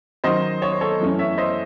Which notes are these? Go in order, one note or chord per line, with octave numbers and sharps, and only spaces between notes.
D#3 F#3 C#4 C5 D#5
C#5
C5
A4 C#5
F#2 E3 A3 C#4
C#5 E5
C5 D#5